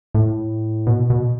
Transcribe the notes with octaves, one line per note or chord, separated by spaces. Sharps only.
A2
B2
B2